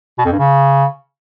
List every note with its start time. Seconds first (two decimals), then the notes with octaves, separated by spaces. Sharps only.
0.18 B2
0.25 F2
0.32 G2
0.39 C#3